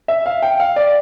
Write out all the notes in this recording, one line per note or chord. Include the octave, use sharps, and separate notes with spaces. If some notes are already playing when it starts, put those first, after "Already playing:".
E5
F5
G5
F5
D5